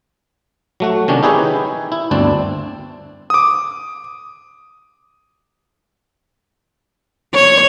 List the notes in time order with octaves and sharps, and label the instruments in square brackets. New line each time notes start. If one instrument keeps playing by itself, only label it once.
[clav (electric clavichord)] F#3 A3 F#4
C3 D#3 C#4 D4
D#4 E4 G4 G#4 B4 C#5
E4
G1 D2 C4 D4 D5
[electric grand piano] D6 D#6
[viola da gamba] C#5